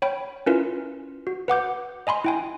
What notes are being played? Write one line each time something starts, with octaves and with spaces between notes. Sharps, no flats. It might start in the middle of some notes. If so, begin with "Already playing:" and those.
C#5 G5 B5
C#4 E4 F4 A#4 B4
F#4
B4 F#5 D6 G6
D#5 G#5 B5 C6
E4 G5 G#5